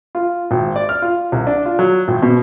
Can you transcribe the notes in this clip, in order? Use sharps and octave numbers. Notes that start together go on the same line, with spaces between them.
F4
G#1
D5
F6
F4
C2
D4
F4
F#3
G#1
B2